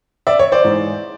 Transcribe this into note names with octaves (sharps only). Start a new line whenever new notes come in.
D5 E5
C#5
C5 D5
G#2 E3 G#3